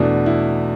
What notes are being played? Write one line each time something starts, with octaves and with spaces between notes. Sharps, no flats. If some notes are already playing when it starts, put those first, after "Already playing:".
Already playing: E2 B2 A3 D4
E4